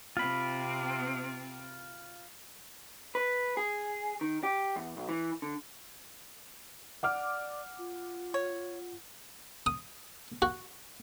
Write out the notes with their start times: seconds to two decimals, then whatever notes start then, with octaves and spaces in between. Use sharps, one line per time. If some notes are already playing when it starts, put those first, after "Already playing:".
0.17 C3 C4 F4 B5
3.15 B4
3.57 G#4
4.21 D#3
4.43 G4
4.76 E2
4.97 B1
5.09 E3
5.42 D3
7.03 D5 F#5 D6 F6
7.78 F4
8.34 C#5
9.66 D#6
10.42 F#4